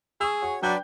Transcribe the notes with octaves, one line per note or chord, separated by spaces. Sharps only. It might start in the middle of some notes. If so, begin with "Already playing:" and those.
G#4 C#6 D#6 E6
F#4 C#5
F#3 D4 B4 D5 G5 G6